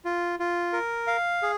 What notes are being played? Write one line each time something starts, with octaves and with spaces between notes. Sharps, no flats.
F4
F4
A#4
F5
G#4